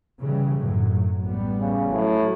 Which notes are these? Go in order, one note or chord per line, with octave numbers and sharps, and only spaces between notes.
C#3 E3 G3
F#2 A2 F#3
F#3
A1 G3 B3
C#3
A2 F#3